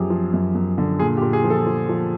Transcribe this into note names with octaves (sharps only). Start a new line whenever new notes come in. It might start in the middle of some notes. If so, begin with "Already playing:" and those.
Already playing: F#2 F3 G4 G#4
F3
F#2
F#2
D3
A#2 G#4
G4
A#2
G#4
F3
A4
F3
F3